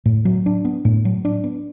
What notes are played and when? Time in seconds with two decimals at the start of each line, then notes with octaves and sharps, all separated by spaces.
0.05 A2
0.25 F#3
0.46 D4
0.65 B3
0.85 A2
1.05 F#3
1.25 D4
1.44 B3